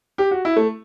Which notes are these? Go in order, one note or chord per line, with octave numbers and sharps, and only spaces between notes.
G4
F#4
E4
A3